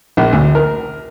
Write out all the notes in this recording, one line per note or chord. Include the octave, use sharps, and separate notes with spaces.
A#1
D2
A#4